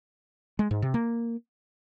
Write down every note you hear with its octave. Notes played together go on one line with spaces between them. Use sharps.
G#3
G#2
C3
A#3